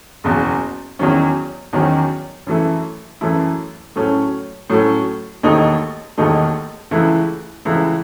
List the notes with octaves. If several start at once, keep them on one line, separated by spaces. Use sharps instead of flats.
F#1 E2 B2
E2 D#3 F#3 C#4
E2 D#3 F#3 C#4
F#2 E3 A3 E4
F#2 E3 A3 E4
A2 F#3 A3 C#4
A2 F#3 A3 C#4
E1 D#2 D#3 A3 D#4
E1 D#2 D#3 A3 D#4
C#2 C#3 E3 A3 E4
C#2 C#3 E3 A3 E4